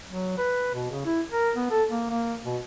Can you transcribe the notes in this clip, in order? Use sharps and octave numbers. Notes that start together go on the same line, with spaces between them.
F#3
B4
B2
C#3
E4
A#4
B3
A4
A#3
A#3
B2